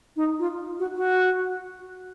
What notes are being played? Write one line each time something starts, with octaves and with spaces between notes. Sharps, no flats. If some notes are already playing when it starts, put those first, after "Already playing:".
D#4
F4
F#4
F#4